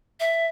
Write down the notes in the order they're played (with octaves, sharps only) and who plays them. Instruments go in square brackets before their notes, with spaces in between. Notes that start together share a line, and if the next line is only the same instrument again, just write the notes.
[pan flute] E5